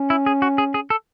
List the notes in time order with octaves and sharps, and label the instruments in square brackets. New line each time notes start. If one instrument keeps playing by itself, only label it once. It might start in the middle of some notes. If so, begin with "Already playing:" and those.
Already playing: [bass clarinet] C#4
[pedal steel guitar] E4
G#4
F#4
G#4
G#4
A4